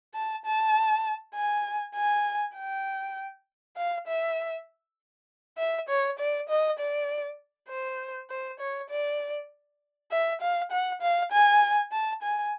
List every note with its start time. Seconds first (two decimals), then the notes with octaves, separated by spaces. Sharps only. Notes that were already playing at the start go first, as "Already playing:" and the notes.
0.14 A5
0.45 A5
1.35 G#5
1.95 G#5
2.56 G5
3.77 F5
4.07 E5
5.58 E5
5.88 C#5
6.19 D5
6.49 D#5
6.79 D5
7.69 C5
8.30 C5
8.60 C#5
8.90 D5
10.11 E5
10.41 F5
10.71 F#5
11.02 F5
11.32 G#5
11.92 A5
12.22 G#5